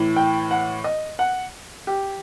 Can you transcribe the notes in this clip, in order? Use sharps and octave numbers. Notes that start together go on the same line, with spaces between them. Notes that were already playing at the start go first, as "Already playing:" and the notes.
Already playing: A2 E3
G5
F#5
D#5
F#5
G4